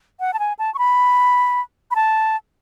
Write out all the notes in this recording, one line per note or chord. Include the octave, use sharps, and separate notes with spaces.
F#5
A5
G#5
A5
C#6
B5
B5
A5